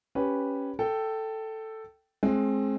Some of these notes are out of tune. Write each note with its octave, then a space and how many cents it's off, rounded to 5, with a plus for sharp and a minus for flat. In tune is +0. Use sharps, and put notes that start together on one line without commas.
C#4 +0 G4 +0 B4 +0
A4 +5 G5 -10
G#3 +25 C4 +30